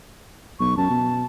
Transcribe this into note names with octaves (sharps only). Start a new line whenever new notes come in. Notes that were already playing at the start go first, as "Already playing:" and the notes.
B1 C#6
F#2 A5
B2